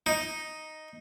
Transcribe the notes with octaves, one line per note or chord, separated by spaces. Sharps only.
D#4